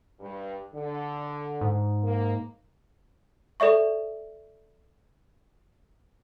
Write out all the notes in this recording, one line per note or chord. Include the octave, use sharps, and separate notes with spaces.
G2
D3
G#2
A#3
A4 D5 E5 C#6